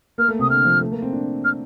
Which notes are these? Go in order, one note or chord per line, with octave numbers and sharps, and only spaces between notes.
A#3 F6
A3
C3 D#6
D3 F6
F3
A3
A#3
C4
D4
F6